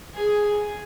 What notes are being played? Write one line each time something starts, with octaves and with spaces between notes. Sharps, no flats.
G#4